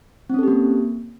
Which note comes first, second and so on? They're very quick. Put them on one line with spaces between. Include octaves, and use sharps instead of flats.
C4 C#4 A4 G4 A#3